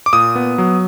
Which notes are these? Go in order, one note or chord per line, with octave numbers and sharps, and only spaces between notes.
D6
A#2 D#6
B3
F#3